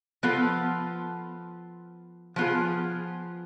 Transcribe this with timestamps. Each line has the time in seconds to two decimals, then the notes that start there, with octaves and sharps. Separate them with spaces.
0.23 F3 B3 F4 A4
2.36 F3 B3 F4 G#4